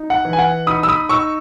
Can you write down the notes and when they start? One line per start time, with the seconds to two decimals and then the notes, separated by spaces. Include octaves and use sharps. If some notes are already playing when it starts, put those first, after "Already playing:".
Already playing: D#4
0.10 F#5
0.25 E3
0.33 G#5
0.39 F#5
0.67 D#4 B5 D#6
0.83 E6
0.89 B5 D#6
1.09 D#4 C#6 E6